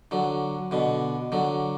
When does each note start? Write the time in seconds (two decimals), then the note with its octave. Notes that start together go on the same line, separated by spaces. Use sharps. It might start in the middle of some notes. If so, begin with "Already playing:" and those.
0.11 D3 F#3
0.71 B2 D3
1.32 D3 F#3